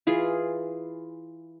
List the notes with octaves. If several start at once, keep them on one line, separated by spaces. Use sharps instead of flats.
E3 F4 G#4